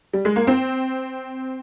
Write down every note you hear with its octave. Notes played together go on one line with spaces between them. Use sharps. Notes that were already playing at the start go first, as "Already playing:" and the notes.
G3
G#3
A#3
C4